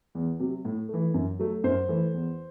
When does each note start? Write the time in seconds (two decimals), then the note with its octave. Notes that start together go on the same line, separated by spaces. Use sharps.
0.15 E2
0.40 C3 F#3
0.65 A2
0.89 E3 A3
1.14 F#2
1.39 F#3 A3
1.64 F#2 C5
1.89 E3 A3
2.14 E2